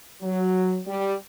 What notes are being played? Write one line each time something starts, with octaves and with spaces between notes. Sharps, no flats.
F#3
G3